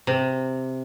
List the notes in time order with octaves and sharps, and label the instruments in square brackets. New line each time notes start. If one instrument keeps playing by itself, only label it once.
[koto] C3